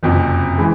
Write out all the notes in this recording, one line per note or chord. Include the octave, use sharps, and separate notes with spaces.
F#1 F2 C3
E3 G#3